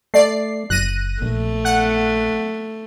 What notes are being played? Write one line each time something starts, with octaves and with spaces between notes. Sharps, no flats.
A3 D5 C7
F#1 F#6 A#6 D#7
A#1 A3
F#5